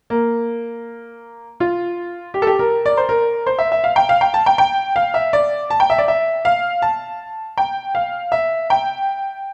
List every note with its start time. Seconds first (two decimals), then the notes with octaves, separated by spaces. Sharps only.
0.10 A#3
1.60 F4
2.34 G4
2.42 A4
2.47 G4
2.59 A#4
2.86 D5
2.97 C5
3.09 A#4
3.47 C5
3.59 E5
3.72 E5
3.84 F5
3.96 G5
4.09 F5
4.21 G5
4.34 A5
4.46 G5
4.58 G5
4.96 F5
5.14 E5
5.33 D5
5.70 A5
5.80 G5
5.90 E5
5.98 D5
6.08 E5
6.45 F5
6.82 A5
7.57 G5
7.95 F5
8.32 E5
8.70 G5